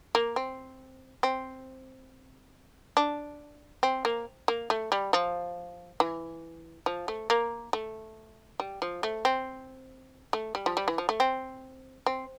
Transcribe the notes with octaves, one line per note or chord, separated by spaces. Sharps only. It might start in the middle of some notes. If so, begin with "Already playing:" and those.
A#3
C4
C4
D4
C4
A#3
A#3
A3
G3
F3
E3
F3
A3
A#3
A3
G3
F3
A3
C4
A3
G3
F3
G3
E3
F3
A3
C4
C4